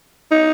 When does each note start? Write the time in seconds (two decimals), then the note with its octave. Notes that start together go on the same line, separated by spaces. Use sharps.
0.31 D#4